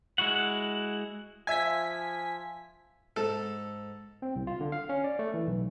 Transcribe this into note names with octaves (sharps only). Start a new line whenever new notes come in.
G#3 E4 F#4 F#5
F3 E5 G#5 G#6 B6
G#2 A4
C4
C2
F4
D3
F5
C#4
D5
A3
E3
B1